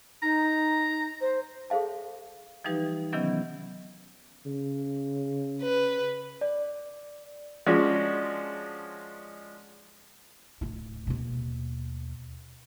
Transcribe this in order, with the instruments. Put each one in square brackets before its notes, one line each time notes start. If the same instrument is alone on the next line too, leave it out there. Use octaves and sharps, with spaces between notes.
[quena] D#4 [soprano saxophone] A#5
[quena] C5
[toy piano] G#4 A4 C5 F5 A5
[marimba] E3 F3 G3 D#4 G4 B4
C3 D#3 E3 F#3 B3 C#4
[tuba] C#3
[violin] B4
[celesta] D5
[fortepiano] F3 G#3 C#4 D4 F#4
[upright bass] D1 E4
D#2 B2